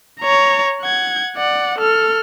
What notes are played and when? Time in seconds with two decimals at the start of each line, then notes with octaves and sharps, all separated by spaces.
0.20 C#5 A#5
0.82 F#5 G#6
1.37 D5 F#5
1.79 A4 F6